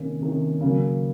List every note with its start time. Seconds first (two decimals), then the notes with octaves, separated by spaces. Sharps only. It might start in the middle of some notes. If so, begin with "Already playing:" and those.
Already playing: C3 D#3 A#3 C#4
0.21 C3 D#3 A#3 C#4
0.61 C#3 F#3 A#3